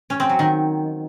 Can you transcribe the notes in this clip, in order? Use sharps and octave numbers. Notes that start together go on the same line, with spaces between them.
C#4
C4
F#3
D#3